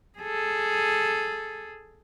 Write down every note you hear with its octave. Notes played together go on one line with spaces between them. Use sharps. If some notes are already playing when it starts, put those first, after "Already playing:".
G#4 A4